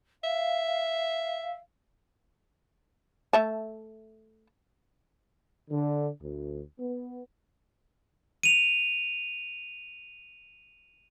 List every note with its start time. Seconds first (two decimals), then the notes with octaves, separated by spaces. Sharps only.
0.24 E5 F5
3.33 A3 E5 A5
5.70 D3
6.22 D2
6.79 B3
8.43 D#7 F7